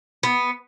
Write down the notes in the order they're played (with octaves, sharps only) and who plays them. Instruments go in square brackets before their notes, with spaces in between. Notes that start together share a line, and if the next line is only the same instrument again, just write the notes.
[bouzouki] B3